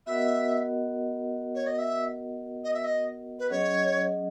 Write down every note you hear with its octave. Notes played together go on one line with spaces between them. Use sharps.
B3 F#4 A#4 D#5 E5 F#5
C#5
D#5
E5
D#5
E5
D#5
B4
F#3 C#4 G#4 C#5 D#5 F#5